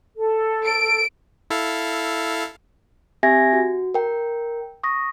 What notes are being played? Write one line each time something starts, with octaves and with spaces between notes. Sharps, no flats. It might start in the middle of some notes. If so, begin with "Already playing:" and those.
A4
D7
E4 A4 F5
C4 G4 E5 G#5 G#6 A#6
F#4
A#4 G5
C#6 D#6 A#6